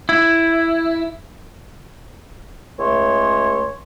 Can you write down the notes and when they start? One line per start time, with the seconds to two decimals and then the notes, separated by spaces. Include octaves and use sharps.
0.09 E4
2.79 C#2 A3 C#5 C6